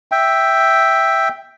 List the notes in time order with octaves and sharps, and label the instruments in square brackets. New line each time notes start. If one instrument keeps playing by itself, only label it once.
[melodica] E5 G5